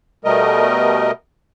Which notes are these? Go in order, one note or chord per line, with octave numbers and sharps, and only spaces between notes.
B2 G3 A3 A#4 D#5